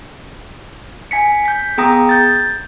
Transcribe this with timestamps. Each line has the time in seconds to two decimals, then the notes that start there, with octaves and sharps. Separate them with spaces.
1.11 G#5 B6 C#7
1.46 G6 B6
1.78 B3 G#4 G5 A#5 D#6 A#6
2.09 G6 A6